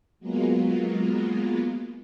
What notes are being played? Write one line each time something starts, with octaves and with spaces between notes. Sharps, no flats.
F#3 G#3 A#3 B3 F4